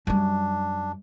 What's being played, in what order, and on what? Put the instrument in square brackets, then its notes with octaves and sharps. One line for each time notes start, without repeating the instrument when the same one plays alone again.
[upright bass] F#2 G3 [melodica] D4